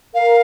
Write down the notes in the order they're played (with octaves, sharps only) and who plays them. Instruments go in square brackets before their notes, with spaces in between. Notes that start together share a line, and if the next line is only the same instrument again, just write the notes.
[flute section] A#4 [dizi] F5